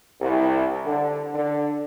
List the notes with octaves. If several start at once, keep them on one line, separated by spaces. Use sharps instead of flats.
C2
D3
D3